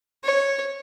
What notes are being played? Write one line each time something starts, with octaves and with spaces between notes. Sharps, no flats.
C#5